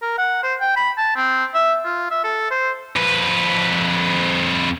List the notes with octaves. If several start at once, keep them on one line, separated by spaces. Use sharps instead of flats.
A#4
F#5
C5
G5
B5
A5
C4
E5
F4
E5
A4
C5
F2 B4